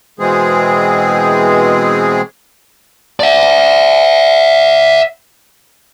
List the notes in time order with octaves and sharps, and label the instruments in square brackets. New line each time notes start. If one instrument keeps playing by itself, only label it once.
[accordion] B2 E3 G#3 C4 G#4
[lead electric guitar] D5 E5